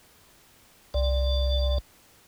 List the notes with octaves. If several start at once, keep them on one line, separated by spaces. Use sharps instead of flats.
C2 D5